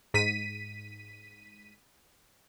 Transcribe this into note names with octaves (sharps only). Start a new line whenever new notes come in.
G#2 B6 D#7